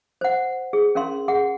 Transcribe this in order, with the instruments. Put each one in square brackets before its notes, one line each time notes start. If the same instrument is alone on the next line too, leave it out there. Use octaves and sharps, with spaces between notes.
[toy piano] C5 F#5
G#4
C#4 A#4 F5 C6
G#4 F#5